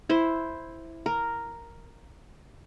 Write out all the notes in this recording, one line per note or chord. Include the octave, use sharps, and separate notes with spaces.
E4 C5
A#4